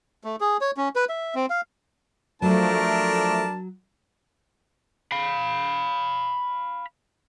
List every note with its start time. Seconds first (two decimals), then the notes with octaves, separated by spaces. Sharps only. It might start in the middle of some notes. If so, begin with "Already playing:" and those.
0.24 A3
0.41 G#4
0.61 C#5
0.77 C#4
0.96 B4
1.09 E5
1.35 C4
1.50 F5
2.42 F3 F#3 A3 D4 A#4 A5
5.12 F5 B5